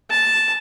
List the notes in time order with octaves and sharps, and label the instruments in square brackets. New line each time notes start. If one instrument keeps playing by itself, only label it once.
[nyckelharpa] A5